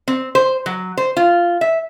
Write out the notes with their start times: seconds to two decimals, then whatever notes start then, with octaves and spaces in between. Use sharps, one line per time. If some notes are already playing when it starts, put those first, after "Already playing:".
0.08 C4
0.35 C5
0.66 F#3
0.97 C5
1.17 F4
1.61 E5